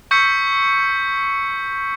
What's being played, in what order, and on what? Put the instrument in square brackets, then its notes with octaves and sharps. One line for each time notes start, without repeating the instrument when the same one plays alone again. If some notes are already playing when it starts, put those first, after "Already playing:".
[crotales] C#6 E6 G6 B6 C#7